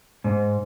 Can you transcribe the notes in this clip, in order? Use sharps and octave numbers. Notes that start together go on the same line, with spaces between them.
G#2